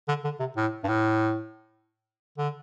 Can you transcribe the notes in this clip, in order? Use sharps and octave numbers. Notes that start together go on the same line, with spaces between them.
D3
D3
C3
A2
G2
A2
D3